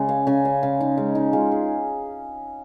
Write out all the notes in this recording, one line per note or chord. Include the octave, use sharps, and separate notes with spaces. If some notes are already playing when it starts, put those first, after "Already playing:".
Already playing: C#3 G#3 G#5
F5
C#3 G#5
F5
C#3 F5
D#4
G#3 C#4
D#4
G#3 F4
G#4